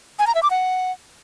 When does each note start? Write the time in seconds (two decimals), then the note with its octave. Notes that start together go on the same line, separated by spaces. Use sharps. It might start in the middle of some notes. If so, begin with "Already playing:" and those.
0.19 G#5
0.27 A#5
0.35 E5
0.43 D6
0.51 F#5